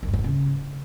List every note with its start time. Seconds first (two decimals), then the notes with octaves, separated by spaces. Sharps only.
0.03 F#2
0.08 G2
0.13 G#2
0.19 F#2
0.24 C#3